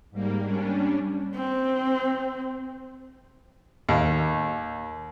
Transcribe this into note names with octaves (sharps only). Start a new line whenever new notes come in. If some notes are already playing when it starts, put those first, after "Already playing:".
G#2 G3 A#3
G3 C#4 D4
C4
D#2